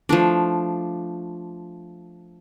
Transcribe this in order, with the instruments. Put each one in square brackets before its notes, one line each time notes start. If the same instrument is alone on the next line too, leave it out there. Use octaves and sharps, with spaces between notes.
[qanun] F3 A3 D4